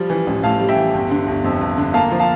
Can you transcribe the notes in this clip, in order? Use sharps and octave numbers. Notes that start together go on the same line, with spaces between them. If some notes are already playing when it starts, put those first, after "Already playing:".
Already playing: F3 G3
E3
A1
A2 F5 A5
G3
E5 G5
E3
G1
D3
G1
F2
G1
D3
A#3 F5 A5
F3
F5 A5